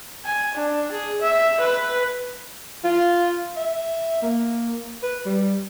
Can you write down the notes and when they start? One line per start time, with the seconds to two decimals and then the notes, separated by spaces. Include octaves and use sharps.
0.25 G#5
0.55 D4
0.91 G#4
1.21 E5
1.60 B4
2.84 F4
3.57 E5
4.23 A#3
5.03 B4
5.25 G3